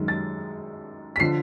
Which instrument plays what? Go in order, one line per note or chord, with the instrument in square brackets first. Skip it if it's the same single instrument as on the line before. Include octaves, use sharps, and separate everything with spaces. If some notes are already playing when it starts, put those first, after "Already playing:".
Already playing: [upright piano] F#2 D#3 G#3
A6
B6
D3 F3 C7